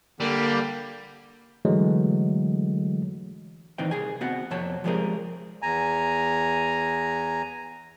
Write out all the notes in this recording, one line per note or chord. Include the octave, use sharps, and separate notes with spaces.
D3 G3 A#3
D3 E3 F#3 G#3 A3
A#2 D#3 E3 C4 D#4 G5
C2 G#4 G#5
B3 C4 F#4 F#5
F2 C3 C#5 A5
F3 G3 G#3 C4 G#4 A#4
E2 G#5 A#5